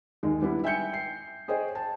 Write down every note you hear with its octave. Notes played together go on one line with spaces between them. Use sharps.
D#2 D#3 G#3
G3 B3 D4 E4
E5 G5 G#5 G6 C#7
C7
G#4 C5 C#5 D#5 G5
A5